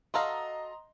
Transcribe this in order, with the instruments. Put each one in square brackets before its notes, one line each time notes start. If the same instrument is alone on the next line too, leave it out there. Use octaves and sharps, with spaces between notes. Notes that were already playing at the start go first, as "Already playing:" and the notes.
[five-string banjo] F#4 A4 F5 [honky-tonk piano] D#5 A#5 C6